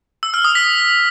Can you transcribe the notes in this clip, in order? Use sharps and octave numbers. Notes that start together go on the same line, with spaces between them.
E6
F6
D#6
B6